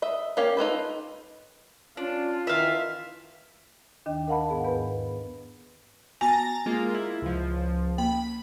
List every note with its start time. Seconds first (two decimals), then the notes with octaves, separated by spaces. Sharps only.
0.02 D#5 E5
0.37 A#3 C#4 G4 F5
0.57 D#4 F4 A4 B4
1.97 C#4 D4 F4
2.47 D#3 E3 E5 F5
4.06 D#2 D#3 D4 D#5 G5
4.28 A#4 D#5 F5 F#5 A5 B5
4.49 G#2 B3 G#4
4.64 E2 G#2 B3 B4 B5
6.21 B3 F#4 G#5 A#5 A6 A#6
6.66 G#3 A#3 F4
6.94 E4
7.22 C#2 F3
7.98 A#3 B5